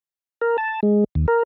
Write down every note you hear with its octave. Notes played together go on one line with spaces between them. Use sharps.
A#4
A5
G#3
D#2
A#4